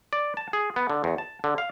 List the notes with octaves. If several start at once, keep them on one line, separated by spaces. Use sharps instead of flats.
D5
A5
G#4
B3
D3
E2
A5
D3
F5